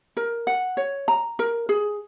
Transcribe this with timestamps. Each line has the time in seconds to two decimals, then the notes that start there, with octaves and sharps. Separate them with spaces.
0.17 A#4
0.47 F#5
0.77 C#5
1.08 A#5
1.39 A#4
1.69 G#4